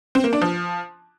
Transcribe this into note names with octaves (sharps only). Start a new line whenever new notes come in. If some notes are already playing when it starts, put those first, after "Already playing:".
C4
A#3
D4
F3